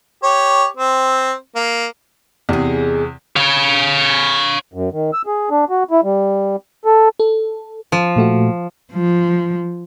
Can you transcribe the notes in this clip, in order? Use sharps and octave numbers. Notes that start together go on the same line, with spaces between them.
G4 C#5
C4
A#3
E2 C3 D#4 G#4
C#5 F5
F#2
D#3
E6
G#4
D4
F#4
E4
G3
A4
A4
F3
A#2 A3 F#4
F3